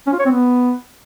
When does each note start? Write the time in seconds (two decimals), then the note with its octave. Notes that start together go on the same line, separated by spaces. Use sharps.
0.07 C#4
0.13 F4
0.19 C#5
0.25 C4
0.32 B3